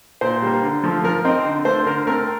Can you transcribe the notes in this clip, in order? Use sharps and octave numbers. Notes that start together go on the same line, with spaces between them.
A#2 C5
G3 A#3
D3
F3 A3
F3 A#4
C4 D#4
D3
A3 D4 C5
D3 A#4
A3 C4 A#4